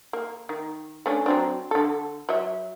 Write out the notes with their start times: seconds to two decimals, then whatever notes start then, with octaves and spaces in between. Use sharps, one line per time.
0.13 A#3
0.49 D#3
1.06 A3 C#4 D4
1.26 F#3 C4 D4
1.71 D3 A4
2.29 F#3 E5